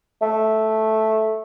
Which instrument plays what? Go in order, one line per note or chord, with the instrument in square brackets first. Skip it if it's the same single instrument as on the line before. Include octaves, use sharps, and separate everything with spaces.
[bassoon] A3